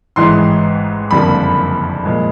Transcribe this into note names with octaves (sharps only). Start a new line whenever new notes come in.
A1 G#2 E3 G#3 C6
F#1 F2 D3 G3 A#3 B5
A#2 F3 G#3